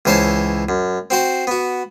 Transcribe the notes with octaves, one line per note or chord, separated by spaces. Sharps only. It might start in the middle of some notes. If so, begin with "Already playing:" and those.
C#2 E3 C5 C#5 A5 C6
F#2
C4 F#4 C5
B3 F#4